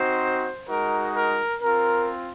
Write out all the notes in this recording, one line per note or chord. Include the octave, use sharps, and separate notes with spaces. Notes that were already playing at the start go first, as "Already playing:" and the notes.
Already playing: C4 D#4 F#4 C5
G#3 D#4 F#4 A#4
A#4
C4 F4 A#4